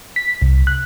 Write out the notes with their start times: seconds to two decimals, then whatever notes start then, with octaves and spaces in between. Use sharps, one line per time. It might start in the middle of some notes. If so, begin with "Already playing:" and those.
0.16 B6
0.42 C2
0.67 F#6